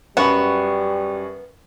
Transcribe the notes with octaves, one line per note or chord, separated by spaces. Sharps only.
F#2 G3 B3 C#4 F#4 F#5 C#6